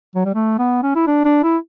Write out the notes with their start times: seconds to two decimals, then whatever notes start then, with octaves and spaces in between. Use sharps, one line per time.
0.15 F#3
0.25 G3
0.34 A3
0.59 B3
0.83 C#4
0.95 E4
1.07 D4
1.25 D4
1.43 E4